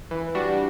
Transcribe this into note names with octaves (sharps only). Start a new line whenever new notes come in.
E3
G3 D4 F#4